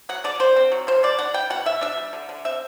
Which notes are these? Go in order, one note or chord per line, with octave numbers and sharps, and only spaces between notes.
F#3 F#5
D3 D5
D3 C5
C4
F#3
B2 C5
B2 D5
D4 F#5
G3 G5
B2 F#5
B2 E5
D4 E5
G3
D3
D3
C4 E5